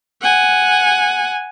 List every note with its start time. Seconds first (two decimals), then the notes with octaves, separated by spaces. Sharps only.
0.21 F#5 G#5